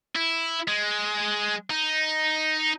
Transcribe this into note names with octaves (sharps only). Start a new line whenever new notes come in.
E4
G#3
D#4